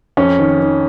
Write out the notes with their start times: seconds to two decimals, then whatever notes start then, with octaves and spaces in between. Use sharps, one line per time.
0.17 F2 C#4
0.39 D#3
0.61 D#3